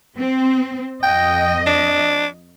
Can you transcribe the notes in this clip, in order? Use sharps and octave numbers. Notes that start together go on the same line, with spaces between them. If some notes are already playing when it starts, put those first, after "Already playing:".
C4
F2 D#5 G5
D4